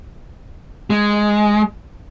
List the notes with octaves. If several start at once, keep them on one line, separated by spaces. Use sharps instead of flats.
G#3